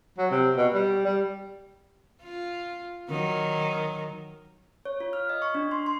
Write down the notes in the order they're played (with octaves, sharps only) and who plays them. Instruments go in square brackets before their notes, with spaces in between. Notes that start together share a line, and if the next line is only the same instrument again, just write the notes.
[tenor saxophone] F#3
C3
B2
G3
G3
[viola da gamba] F4
D#3 F#3
[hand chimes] C#5
F4
F6
D#5
C#6
D4
C6
C6